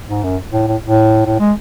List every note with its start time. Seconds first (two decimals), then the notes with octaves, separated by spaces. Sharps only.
0.09 G#2
0.23 F#2
0.53 A2
0.68 A2
0.87 A2
1.26 A2
1.40 G#3